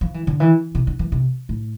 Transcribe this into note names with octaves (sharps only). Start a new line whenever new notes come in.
F3
E3
D3
E3
C3
D3
E3
C3
A2